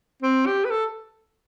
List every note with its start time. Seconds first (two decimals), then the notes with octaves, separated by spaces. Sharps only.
0.22 C4
0.46 G4
0.65 B4
0.71 A4